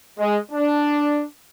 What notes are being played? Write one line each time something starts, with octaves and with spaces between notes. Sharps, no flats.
G#3
D4